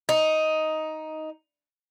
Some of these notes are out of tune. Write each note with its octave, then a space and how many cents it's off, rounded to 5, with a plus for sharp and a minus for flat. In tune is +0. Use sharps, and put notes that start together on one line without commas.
D#4 +10